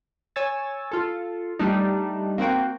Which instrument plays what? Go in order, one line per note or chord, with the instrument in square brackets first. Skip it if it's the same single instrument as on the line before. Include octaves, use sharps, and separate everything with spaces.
[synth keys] C#5 G#5 E6 A6
F4 A4
G3 A3 D4 D#4
A#3 C4 F#4 G5